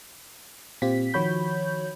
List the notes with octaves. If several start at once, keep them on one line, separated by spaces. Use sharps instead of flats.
A#2 C4 F4 G4 B6
D#3 F3 F#4 C#5 B5 G6